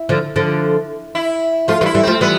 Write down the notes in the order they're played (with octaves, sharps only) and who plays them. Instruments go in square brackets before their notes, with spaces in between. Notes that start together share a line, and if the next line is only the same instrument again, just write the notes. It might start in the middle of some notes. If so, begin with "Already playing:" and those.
Already playing: [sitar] E4
[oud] D3 F3
D3 F3
[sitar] E4
[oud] F3 A3 [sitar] F4
[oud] E3 G3 [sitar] F4
[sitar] E4
[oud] E3 G3
[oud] F3 A3 [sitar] C4
[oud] E3 G3 [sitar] B3